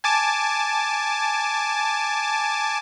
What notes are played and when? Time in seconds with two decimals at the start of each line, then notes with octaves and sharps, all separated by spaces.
0.04 G#5 A5 D6